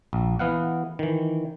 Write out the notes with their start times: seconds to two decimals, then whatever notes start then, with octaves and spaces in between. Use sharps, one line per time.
0.13 A#1
0.39 E3 B3 F5 F#5
0.99 D#3 E3